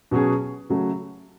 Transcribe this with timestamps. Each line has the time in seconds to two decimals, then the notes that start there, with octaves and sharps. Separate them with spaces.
0.11 B2 F#3 C#4 G#4
0.69 C#3 F#3 A3